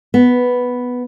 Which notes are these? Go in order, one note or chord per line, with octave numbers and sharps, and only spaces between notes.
B3